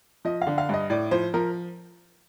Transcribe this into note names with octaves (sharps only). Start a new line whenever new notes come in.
F3 D#5
F5
D3
F5
G2 D#5
A2 D5
F3 C5
F3 A#4